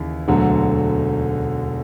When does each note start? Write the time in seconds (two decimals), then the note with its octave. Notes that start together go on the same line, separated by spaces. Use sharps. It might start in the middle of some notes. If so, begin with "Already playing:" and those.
Already playing: D#2 C#3 E3
0.28 E1 D2 D3 F#3